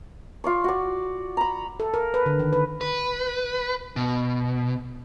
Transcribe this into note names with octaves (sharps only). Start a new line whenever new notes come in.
F4 D5 C#6
F#4 D5
A#5 B5
A4
A#4
B4
D3
D#3
B4
B4
B2